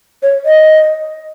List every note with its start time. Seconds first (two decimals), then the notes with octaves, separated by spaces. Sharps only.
0.23 C#5
0.45 D#5